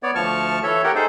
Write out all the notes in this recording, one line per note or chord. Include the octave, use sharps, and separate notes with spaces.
B3 C#5 D5
D2 F3 A5 C#6 F6
E3 A4 C#5 E5
G4 A#4 F#5 G5
D#4 G#4 A4 C5